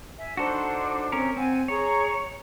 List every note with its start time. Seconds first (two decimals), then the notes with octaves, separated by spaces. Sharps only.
0.17 E5 G#5
0.37 D4 D#4 F#4 A4 C5
1.12 C4 C#4 A#4
1.36 C4 F#5 G#5
1.68 G#4 C#5 A#5 C#6